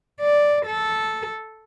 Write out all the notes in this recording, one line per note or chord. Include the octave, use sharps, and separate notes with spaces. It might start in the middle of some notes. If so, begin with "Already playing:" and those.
D5
A4